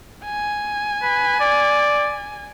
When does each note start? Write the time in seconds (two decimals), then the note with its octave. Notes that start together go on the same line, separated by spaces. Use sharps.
0.24 G#5
1.02 B4
1.40 D5